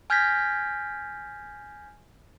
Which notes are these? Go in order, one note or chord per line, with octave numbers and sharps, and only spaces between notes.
G#5 F6 G6 G#6 A#6 B6